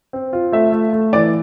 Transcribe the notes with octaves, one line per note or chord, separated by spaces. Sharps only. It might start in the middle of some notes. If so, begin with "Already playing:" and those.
C4
F4
A3 E5
A3
A3
E3 D5